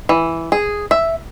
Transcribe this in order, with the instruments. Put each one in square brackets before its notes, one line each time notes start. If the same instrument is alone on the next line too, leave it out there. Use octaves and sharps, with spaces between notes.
[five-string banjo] E3
G#4
E5